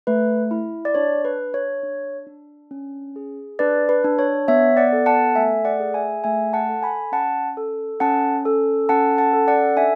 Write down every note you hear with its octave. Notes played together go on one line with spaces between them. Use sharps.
A3 B4
E4
D5
D4 C#5
B4
D4
C#5
D4
D4
C#4
G#4
D4 B4 D5
B4
D4
C#5
B3 C#5 E5
D5 F#5
A4
F#5 A5
A3 E5 G#5
D5 F#5
G#4
E5 G#5
A3 E5 G#5
F#5 A5
A4
G#5 B5
C#4 F#5 A5
A4
C#4 F#5 A5
A4
C#4 F#5 A5
F#5 A5
A4
D5 F#5
D4 E5 G#5